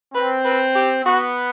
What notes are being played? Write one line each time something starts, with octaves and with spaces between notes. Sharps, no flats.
C4 B4
B4
G4
B3 F#4